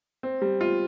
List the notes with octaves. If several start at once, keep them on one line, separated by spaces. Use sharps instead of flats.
C4
G3
F4